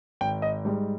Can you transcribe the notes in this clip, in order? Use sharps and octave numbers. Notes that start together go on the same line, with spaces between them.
G#1 G5
D#5
G#2 G3